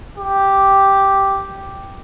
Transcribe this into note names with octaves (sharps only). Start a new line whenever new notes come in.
G4